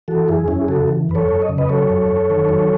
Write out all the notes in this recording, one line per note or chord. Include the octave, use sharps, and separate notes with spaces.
E3 F#4 A4
F#2 E4 G#4
F#2 C#4 E4
G#4
C#3 F#4 A4
E3
F#2 B4
A4 C#5
F#2
D#5
C#3
B4 D#5
F#3 A4 C#5
F#2
F#2
D#3
F#3